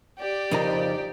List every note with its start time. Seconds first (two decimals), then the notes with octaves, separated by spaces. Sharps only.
0.19 G4 D5
0.51 F2 C#3 F3 D#4 A#4 A#5